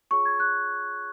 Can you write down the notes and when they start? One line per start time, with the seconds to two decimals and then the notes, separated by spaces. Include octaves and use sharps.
0.11 F4 G#4 C#5 C#6
0.25 G#6
0.40 F#6